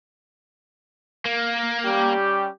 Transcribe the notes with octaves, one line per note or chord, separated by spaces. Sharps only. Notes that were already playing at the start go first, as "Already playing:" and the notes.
A#3
G3 C#4 G4